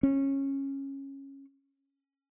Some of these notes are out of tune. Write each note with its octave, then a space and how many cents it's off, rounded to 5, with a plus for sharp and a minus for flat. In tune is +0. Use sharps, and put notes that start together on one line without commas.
C#4 -15